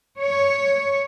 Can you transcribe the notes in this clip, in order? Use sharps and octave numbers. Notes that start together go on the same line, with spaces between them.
C#5